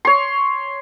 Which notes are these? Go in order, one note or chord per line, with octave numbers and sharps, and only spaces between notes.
C#5 C6